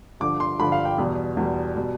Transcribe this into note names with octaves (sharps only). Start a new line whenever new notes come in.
G2 D3 F3 D6
C6
G2 D3 F3 B5
F5
G5
E2 B2 G3
E2 B2 G3
B2 G3